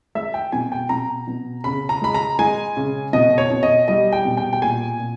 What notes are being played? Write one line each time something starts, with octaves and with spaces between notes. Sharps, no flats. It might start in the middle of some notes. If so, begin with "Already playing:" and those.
G#3 E5
G5
B2 G#5
G5
B2 A#5
B2
C#3 B5
A#5
G#3 B5
A#5
G#3 G#5
C#3
B2 D#5
C#5
B2
D#5
G3 D#5
G5
B2
G5
G5
A#2 G#5
A#2